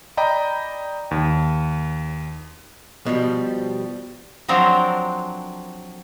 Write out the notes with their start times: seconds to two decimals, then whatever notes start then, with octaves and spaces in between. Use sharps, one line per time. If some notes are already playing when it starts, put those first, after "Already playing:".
0.17 D5 D#5 G5 A#5 B5
1.11 D#2
3.06 B2 F3 G3
4.48 F3 F#3 C4 D4 A4 A#4